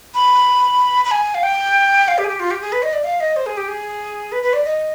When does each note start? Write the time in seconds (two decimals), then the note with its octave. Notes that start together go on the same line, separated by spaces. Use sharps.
0.15 B5
1.05 B5
1.11 G#5
1.34 F5
1.43 G5
2.08 F5
2.18 G4
2.24 G#4
2.28 G4
2.40 F4
2.51 G4
2.61 G#4
2.72 B4
2.82 D#5
2.93 D5
3.04 F5
3.20 D#5
3.36 C5
3.46 G#4
3.57 G4
3.68 G#4
4.32 B4
4.43 B4
4.53 D5
4.64 D#5